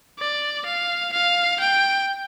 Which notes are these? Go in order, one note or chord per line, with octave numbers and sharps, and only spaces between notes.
D5
F5
F5
G5